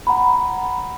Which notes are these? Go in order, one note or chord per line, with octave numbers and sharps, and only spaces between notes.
F#5 A#5 B5